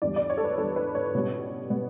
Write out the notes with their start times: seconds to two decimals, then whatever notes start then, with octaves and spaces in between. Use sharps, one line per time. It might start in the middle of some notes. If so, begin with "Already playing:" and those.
0.02 E2 D3 G3 D5
0.16 D5
0.30 C#5
0.37 A4
0.44 B4
0.58 E2 D3 G3 A4
0.76 B4
0.95 C#5
1.14 C#2 B2 G3 B3
1.69 B2 G3 B3